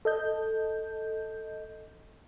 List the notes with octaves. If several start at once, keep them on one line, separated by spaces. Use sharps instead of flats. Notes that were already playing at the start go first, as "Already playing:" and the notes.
A4 D#5 G6